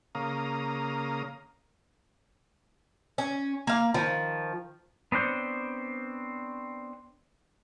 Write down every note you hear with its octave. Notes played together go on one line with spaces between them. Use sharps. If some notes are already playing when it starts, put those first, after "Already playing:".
C#3 A#3 F5 A#5 D#6
C#4
A#3 F5
D#3 F3
B3 C4 D4 C5 C#5